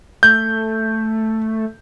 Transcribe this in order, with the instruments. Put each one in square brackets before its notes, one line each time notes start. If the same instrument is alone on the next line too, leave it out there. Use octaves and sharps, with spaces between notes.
[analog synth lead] A3 [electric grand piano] G6